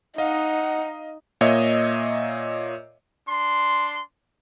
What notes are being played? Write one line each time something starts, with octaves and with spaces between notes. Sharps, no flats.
D#4 D#5 F5 F#5
A#2 A#3 C#5 D#5 E5
D4 C6